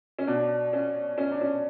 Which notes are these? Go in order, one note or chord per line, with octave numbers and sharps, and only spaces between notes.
C#4
B2 D4
C#4
C#4
D4
C#4